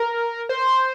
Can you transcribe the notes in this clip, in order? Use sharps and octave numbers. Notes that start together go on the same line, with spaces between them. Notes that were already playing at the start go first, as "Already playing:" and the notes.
Already playing: A#4
C5